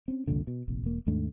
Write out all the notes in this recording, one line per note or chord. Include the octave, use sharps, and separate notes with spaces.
C4 C#4
C2 F2 A#2 D3
B2
F1 A#1 F2
E1 A#3
D#2 G#2 A3 D4